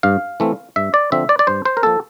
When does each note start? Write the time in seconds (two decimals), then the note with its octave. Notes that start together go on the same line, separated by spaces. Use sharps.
0.03 G2 F5
0.40 E3 A3 C4
0.76 G2 E5
0.94 D5
1.12 D3 F3 C4 E5
1.29 D5
1.39 D5
1.47 G2 C5
1.65 C5
1.77 A#4
1.83 F3 A#3 A4